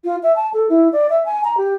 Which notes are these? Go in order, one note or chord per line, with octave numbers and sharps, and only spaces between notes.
F4
E5
A5
A4
E4
D5
E5
G#5
A#5
G4